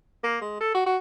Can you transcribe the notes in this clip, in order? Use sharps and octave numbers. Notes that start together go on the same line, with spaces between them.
A#3
G#3
A4
F#4
F#4